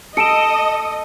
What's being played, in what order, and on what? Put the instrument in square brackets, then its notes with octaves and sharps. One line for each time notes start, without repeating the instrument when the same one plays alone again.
[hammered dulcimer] A4 [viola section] D#5 [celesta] C#7 D7 E7